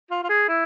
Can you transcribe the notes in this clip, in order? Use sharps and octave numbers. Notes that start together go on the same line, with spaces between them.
F4
F4
G#4
E4